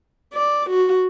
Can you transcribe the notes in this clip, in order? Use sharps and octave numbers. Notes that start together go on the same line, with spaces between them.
D5
F#4